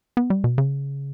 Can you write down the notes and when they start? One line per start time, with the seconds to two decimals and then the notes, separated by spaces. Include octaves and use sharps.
0.17 B3
0.30 G3
0.44 B2
0.58 C#3